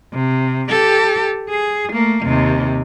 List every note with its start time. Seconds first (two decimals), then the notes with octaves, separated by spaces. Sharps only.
0.14 C3
0.70 G4 A4
1.50 G#4
1.93 A3 A#3
2.26 D#2 C3